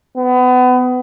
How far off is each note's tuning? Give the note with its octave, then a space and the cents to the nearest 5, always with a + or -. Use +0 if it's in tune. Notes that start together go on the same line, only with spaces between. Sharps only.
B3 +30